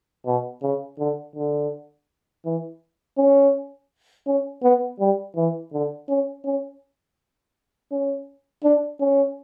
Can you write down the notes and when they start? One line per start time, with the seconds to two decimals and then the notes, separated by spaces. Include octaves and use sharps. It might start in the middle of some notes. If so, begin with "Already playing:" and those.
0.26 B2
0.62 C#3
0.99 D3
1.36 D3
2.45 E3
3.18 C#4
4.27 C#4
4.63 B3
5.00 G3
5.36 E3
5.73 D3
6.09 C#4
6.45 C#4
7.92 C#4
8.64 D4
9.00 C#4